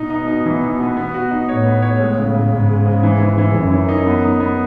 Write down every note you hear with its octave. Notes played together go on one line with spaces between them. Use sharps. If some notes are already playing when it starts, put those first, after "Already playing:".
Already playing: B2 D#4
D#4
D#4
E3
D#4
B3
B3
F#4
D#4
A2 C#5
B3
C#5
G#3
C#3
C#3
G#2 C#3
C#3
C#3
E3
E3
E3
F#2 E3
E3
D#4
B3
D#4
B3